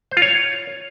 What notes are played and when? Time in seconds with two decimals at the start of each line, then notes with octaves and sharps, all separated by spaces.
0.11 C5
0.17 F4
0.22 C#5